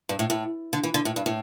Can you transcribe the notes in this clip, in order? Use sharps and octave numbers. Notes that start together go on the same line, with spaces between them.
G2
A2
A2
D3
E3
D3
A2
G2
A2